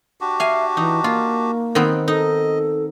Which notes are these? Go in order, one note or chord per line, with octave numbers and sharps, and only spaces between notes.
D4 F#4 G4
E5 F5 G#5
E3 D#4
A#3 F4
D#3 B3 C4
D#4 A4 D#5